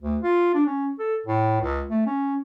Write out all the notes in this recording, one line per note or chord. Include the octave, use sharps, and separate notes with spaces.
D2
F4
D4
C#4
A4
A2
C#2
A3
C#4